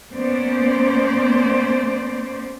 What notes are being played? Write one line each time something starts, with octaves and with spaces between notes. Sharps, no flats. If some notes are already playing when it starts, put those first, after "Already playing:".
A#3 B3 C#4 C5 D5